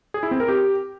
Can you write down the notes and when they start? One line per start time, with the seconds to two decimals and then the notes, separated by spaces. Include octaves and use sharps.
0.14 G#4
0.23 E4
0.31 C4
0.40 A#4
0.48 G4